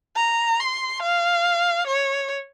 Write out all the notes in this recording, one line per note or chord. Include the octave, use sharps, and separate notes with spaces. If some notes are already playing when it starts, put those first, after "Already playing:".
A#5
C6
F5
C#5